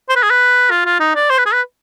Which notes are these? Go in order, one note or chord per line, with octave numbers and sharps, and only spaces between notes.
C5
B4
G#4
B4
F4
F4
D#4
D5
C5
B4
G#4
B4